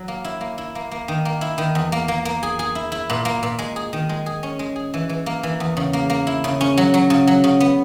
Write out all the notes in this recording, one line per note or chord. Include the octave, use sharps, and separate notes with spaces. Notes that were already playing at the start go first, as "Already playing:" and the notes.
Already playing: F#3
A#3
E4
A#3
E4
A#3
A#3
D#3
A#3
E4
D#3
E2
A#3
A#3
A#3
G#4
G#4
E4
E4
A#2
A#3
A#2
G#3
G#4
D#3
G#3
G#4
C#4
G#3
G#4
E3
E3
A#3
E3
E2
C#3
A#3
A#3
E4
C#3
C#4
F#3
F#3
C#3
F#3
C#3
B3